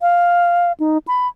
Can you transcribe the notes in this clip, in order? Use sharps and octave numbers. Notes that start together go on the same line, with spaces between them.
F5
D#4
B5